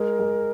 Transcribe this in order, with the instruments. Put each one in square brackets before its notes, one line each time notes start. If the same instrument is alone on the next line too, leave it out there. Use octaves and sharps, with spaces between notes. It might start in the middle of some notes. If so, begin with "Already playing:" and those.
Already playing: [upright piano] G#3 [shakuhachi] A#4
[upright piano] G#3